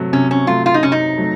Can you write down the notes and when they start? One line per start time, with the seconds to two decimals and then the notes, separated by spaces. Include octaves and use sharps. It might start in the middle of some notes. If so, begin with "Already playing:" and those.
Already playing: C3 F#3 A3
0.13 C3 C#4
0.31 C#4
0.47 F#3 A3 F4
0.66 F4
0.74 D#4
0.83 C3 C#4
0.92 D#4
1.18 F#3 A3